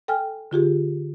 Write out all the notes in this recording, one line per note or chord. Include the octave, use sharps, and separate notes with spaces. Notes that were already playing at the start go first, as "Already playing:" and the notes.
A4 G5 G#5 F6
D3 F4 G4 G#4